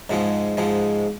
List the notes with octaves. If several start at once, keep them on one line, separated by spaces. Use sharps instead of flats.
G#2 F3 G#3
G#2 F3 G#3